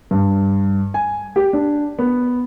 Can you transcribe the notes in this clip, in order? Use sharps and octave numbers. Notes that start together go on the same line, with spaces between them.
G2
G#5
G4
D4
B3